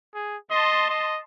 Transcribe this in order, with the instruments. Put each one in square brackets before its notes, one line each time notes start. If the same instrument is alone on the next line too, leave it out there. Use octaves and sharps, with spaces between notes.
[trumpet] G#4
[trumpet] D#5 [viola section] A5 C6
[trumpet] D#5